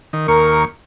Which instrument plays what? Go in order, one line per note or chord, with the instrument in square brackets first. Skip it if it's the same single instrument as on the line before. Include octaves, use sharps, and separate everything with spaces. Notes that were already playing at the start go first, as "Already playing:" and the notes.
[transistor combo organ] D#3
[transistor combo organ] D#2 C#6 [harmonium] A#4